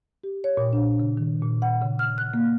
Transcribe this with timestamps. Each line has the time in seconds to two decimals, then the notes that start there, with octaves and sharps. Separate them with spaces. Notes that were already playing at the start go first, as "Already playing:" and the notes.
0.24 G4
0.44 C#5
0.57 A#2
0.73 D4
1.00 C#3
1.17 D#3
1.42 A#2
1.62 F#5
1.81 C#3
1.99 F6
2.18 F#6
2.34 A#3